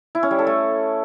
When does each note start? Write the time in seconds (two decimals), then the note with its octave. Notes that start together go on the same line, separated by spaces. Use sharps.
0.15 E4
0.23 C#4
0.31 G3
0.39 A4
0.47 A3